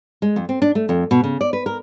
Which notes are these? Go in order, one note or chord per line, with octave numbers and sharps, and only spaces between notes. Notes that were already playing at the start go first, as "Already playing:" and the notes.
G#3
F2
C4
D4
A3
F2
B2
C#3
D5
B4
A#4